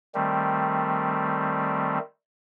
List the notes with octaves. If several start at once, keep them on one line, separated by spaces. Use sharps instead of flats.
D#3 G3 A3 C4